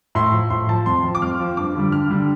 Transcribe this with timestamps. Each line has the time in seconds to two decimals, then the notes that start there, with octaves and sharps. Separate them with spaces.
0.15 A2 C6
0.33 F3
0.50 A2 C6
0.69 F3 A5
0.86 F2 C6
1.04 F3
1.15 D6
1.22 F2 F6
1.40 F3
1.57 G2 D6
1.75 D3 G3
1.92 G2 F6
2.11 D3 G3